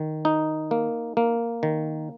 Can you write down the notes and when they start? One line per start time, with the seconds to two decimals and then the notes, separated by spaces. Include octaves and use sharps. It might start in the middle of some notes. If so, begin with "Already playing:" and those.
Already playing: D#3
0.25 D#4
0.71 A#3
1.17 A#3
1.63 D#3